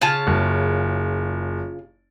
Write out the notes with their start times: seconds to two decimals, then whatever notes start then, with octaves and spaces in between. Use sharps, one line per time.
0.02 C#3 F4 A5
0.27 F#1